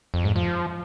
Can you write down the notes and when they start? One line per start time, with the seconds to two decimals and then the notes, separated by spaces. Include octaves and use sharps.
0.14 F2
0.25 G#2
0.36 F3